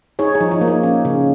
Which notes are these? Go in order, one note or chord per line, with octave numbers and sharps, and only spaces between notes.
D#4 G#4 C#5
D#4 G#4
F3
D#4
A#3
D#4
C#4
C#3